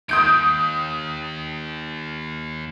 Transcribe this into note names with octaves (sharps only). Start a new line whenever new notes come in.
D#2 D#6 G6 D7